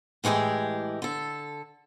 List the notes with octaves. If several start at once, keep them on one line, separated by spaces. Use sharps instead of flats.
A2 E3 G#3 G4 G#4
D3 A4